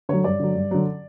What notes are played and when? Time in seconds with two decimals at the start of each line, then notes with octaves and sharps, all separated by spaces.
0.09 D3 F#3 C#5
0.24 G2 D5
0.40 D3 F#3
0.55 G2
0.71 D3 F#3